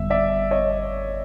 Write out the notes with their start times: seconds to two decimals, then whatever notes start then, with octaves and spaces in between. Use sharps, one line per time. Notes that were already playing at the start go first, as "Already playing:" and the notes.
Already playing: G1 F2 D3 G3 B3 E5
0.10 D5 E5
0.51 C#5 D#5